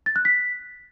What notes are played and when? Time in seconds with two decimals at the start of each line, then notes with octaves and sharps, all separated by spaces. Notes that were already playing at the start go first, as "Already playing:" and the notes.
0.06 A6
0.16 F#6
0.25 B6